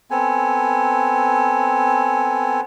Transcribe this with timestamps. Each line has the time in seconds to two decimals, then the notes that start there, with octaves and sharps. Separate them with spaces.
0.11 B3 C4 A4 G#5